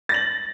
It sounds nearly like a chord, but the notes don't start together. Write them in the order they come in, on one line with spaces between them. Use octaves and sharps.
A6 A#6 F#7